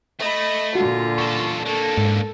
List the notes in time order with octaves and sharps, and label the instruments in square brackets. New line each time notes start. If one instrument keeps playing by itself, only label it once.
[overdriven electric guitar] A3 [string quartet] D#5 B5
[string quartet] A#2 D3 F4 [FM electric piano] F#4
[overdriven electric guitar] E2 A4 [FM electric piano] C#6
[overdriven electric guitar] D3 A#3 [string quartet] A4
[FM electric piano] G#2